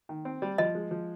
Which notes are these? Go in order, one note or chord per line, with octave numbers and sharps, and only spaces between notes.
D#3
C4
G3
F3 D#5
G#3
F3